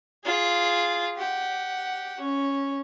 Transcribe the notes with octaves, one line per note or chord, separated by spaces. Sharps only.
F4 G#4
G4 F#5
C#4